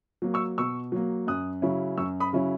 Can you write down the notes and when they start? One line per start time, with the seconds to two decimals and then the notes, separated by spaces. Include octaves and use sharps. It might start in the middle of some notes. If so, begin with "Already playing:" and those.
0.22 F#3 A#3
0.34 C#6 E6
0.58 B2 C#6 E6
0.92 F#3 A#3
1.27 F#2 D#6 F#6
1.62 C#3 F#3 C#4 E4
1.97 F#2 C#6 E6
2.20 B5 D#6
2.33 C#3 F#3 C#4 E4